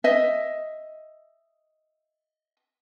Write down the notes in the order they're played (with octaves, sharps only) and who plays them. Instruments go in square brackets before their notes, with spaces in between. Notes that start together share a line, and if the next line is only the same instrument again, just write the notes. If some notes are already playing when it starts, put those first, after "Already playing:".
[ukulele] D#5 E5